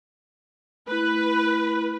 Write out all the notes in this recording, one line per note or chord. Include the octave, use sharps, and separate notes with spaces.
A3 E4 B4